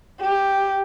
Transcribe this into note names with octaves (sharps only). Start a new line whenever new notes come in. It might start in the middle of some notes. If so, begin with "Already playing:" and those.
G4